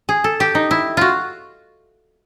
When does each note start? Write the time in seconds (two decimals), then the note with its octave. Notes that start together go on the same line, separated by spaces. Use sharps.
0.09 G#4
0.24 A4
0.40 G4
0.55 D#4
0.71 E4
0.97 F4 F#4